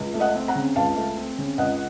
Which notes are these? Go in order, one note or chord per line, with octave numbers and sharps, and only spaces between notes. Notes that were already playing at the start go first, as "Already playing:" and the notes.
Already playing: C#2
A3
D#5 F#5
C4
F#5 A#5
C#3
C#2 F5 A5
A3
C4
C#3
C#2 D#5 F#5